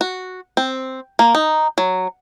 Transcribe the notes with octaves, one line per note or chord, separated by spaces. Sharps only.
F#4
C4
A#3
D#4
F#3